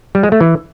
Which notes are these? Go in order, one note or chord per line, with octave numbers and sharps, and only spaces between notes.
G3
G#3
A3
E3